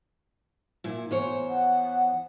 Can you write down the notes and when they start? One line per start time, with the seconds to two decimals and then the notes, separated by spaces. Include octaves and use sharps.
0.84 A#2 E4
1.11 E2 C5 C#5
1.49 F#5